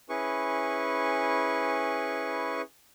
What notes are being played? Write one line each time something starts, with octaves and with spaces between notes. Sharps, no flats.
C#4 E4 G#4 B4 C#6